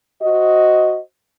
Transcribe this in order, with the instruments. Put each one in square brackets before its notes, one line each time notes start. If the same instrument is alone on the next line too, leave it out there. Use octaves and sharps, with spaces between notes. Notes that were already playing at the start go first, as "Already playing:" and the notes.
[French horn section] F#4 C5 D#5